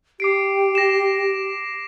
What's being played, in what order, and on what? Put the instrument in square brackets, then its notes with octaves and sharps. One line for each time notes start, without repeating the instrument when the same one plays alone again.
[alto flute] G4 [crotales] D6 C7 D7
[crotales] A#6 E7